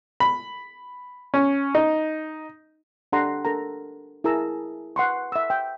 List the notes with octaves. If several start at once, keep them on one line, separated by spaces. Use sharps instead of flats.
B5
C#4
D#4
D4 G4 A4 F#5 A#5 C6
D4 A4 A#4 A#5
E4 G#4 A#4 A5 A#5 E6
B4 F#5 C6 C#6
E5 E6
G5